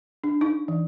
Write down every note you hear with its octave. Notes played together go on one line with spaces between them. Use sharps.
D4
D#4
E3